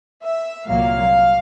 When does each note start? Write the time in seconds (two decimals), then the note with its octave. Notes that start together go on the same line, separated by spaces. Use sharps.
0.23 E5
0.68 C2 A#2 F#3 A#3 F5